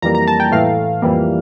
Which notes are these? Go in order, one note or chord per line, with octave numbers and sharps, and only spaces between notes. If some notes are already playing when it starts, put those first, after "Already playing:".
F2 E3 G3 A#3 A#5
A#5
A5
G5
A2 E3 A3 F5
F2 E3 G3 A#3